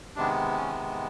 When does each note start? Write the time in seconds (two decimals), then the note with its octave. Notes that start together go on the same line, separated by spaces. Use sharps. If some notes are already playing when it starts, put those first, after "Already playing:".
0.16 C3 D#3 G#3 B3 D4
0.58 C#4